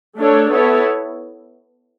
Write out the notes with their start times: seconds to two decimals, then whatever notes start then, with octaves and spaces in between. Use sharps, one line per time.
0.18 A3 D4 A4 C#5
0.52 B3 E4 A4 C#5